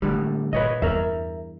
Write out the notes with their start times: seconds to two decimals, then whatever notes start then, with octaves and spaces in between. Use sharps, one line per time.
0.02 A2 D3 G3 G#3
0.53 A#2 B4 C#5 D#5
0.82 E2 G2 A#4 E5